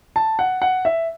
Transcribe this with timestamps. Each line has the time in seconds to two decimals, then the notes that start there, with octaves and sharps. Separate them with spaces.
0.16 A5
0.39 F#5
0.62 F#5
0.85 E5